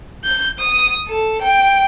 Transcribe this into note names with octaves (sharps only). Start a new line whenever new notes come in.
G6
D#6
A4
G5